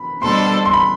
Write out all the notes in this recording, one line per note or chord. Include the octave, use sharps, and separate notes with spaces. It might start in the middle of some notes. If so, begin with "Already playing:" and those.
Already playing: B5
B2 G3 D4 A4 C5 C6
C6
B5